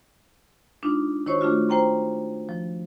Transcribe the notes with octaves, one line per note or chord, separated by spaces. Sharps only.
G#3 D4 D#4 F4
D#3 E4 F#4 C5 C#5 C#6
A3 D4 F4 F#4
C5 G5 A#5 C6
F3